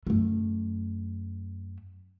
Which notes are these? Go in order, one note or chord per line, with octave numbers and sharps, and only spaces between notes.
F#2 A3